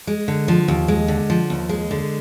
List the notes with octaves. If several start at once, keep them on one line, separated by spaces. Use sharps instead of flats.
G#3
D3
F3
D#2
G#3
D3
F3
D#2
G#3
D3